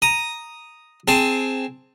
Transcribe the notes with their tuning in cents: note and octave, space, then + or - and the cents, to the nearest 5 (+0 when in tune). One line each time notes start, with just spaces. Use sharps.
A#5 +0 D#6 +0
C4 +0 G#4 +5 A5 +15